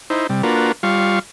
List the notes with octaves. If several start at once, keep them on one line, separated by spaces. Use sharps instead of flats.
D#4 E4 C5
C3 G3
A#3 D4 F4 F#4 A#4 B4
G3 F4 F5 C#6